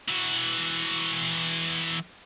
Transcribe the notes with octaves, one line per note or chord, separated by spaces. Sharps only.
E3 F#4